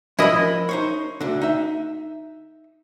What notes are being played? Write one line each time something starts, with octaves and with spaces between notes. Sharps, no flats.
F3 E4 A#4 D#5 B5
D#4 C5 C#5
D2 D3
D#4 E5